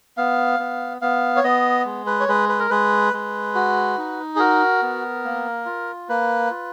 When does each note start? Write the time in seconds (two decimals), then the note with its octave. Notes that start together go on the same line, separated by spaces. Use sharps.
0.17 B3 F5
0.60 B3
1.01 B3 F5
1.36 C#5
1.44 B3 D#5
1.85 G#3
2.06 B4
2.20 C#5
2.29 G#3 B4
2.49 B4
2.59 A#4
2.70 G#3 B4
3.13 G#3
3.55 F#4
3.98 D#4
4.36 G#4
4.39 F#4 A#4
4.82 B3
5.25 A#3
5.66 F4
6.09 A#3 B4
6.50 F4